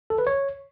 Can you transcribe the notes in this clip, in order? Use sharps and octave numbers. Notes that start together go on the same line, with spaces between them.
A4
B4
C#5